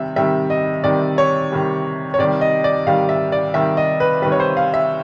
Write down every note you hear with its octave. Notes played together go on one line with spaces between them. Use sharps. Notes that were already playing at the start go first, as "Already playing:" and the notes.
Already playing: C3 D#3 G3 E5
C3 D#3 G3 E5
D#5
C3 D#3 G3 D5
C#5
C3 D#3 G3
C#5
C3 D#3 G3 D5
D#5
D5
C3 D#3 G3 F5
E5
D5
C3 D#3 G3 E5
D#5
B4
C3 D#3 G3 B4
C#5
C5
F5
E5